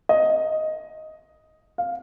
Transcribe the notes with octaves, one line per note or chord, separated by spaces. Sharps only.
D#5
F5